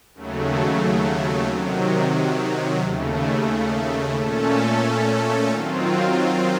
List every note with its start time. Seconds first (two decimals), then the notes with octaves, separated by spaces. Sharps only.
0.14 D#2 C#3 F#3 A3
1.48 C3 D#3 F#3
2.82 D#2 C#3 A3
4.16 A#2 A3 C#4 A4
5.50 D#3 F#3 C4 F4